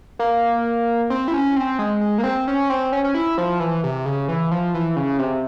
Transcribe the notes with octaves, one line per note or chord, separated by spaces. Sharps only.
A#3
C4
E4
C#4
C4
G#3
G#3
A#3
C4
C#4
C4
C#4
C#4
E4
F3
E3
C3
C#3
E3
F3
E3
C#3
C3